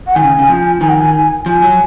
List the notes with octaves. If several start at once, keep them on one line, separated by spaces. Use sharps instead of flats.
F#5
D#3 G#5
C#3
C#3
F3
D#3 G#5
F#5
G#5
F3 G#5
F#3